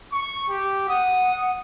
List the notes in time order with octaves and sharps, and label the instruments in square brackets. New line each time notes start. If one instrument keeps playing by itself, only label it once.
[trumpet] C#6
G4
[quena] F#5 [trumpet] D#6